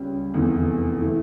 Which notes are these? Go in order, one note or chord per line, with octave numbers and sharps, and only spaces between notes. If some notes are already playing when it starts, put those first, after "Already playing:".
Already playing: C#2 C#3 G3 C#4
F1 E2 E3
E3 A3